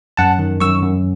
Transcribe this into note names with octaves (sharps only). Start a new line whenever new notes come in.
F#2 F#5 A5
D#3
F#2 C#6 E6
F#2